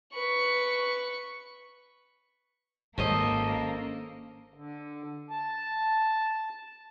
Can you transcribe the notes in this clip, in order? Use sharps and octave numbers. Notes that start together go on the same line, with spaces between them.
B4 C#6
G#1 A#3 C#4 A4 C5 D#5
D3
A5